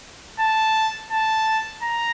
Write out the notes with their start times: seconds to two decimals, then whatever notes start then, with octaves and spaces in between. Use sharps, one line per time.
0.40 A5
1.11 A5
1.82 A#5